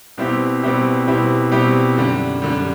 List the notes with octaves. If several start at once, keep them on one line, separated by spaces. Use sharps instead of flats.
B2 G3 C4 E4 G4
B2 G3 C4 E4 G4
B2 G3 C4 E4 G4
B2 G3 C4 E4 G4
F#2 D3 G3
F#2 D3 G3